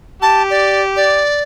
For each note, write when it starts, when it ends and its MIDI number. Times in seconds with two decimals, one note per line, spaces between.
0.22 1.24 67
0.22 0.43 81
0.50 0.82 74
0.96 1.43 74